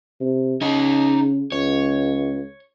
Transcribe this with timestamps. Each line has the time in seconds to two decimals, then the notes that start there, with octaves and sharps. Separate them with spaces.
0.20 C3
0.61 C#3 D#4 C#5
1.52 C#2 C#5